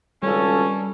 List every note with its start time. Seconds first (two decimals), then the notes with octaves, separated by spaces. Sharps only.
0.23 G#1 C#2 G3 C#4 A4